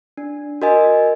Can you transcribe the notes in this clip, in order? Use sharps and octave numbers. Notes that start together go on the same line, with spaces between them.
D4
F#4 A#4 D#5 G#5